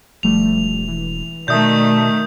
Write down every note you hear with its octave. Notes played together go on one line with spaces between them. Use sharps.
E1 F3 G3 A3 F7
E3
B2 D#3 A3 D5 E5 A5 D#6 G6